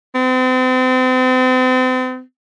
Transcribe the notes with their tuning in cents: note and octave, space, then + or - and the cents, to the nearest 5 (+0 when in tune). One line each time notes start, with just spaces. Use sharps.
C4 -40